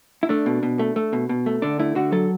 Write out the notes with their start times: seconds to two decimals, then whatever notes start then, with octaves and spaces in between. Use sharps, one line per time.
0.23 E4
0.29 A3 D4
0.46 B2
0.63 B2
0.79 A3
0.96 A3
1.13 B2
1.29 B2
1.46 A3
1.62 D3 D4
1.79 A3 E4
1.95 D3 F#4
2.12 F#3 A4